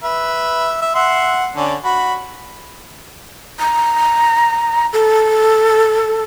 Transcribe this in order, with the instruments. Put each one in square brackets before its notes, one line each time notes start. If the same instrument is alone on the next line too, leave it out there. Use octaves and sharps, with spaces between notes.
[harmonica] B4 E5
E5
E5 F#5 C6
D3 C#4 D5
F#4 B5
[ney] A#5
A4